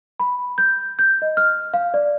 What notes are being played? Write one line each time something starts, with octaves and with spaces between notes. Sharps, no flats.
B5
G6
G6
D#5
F6
F5
D5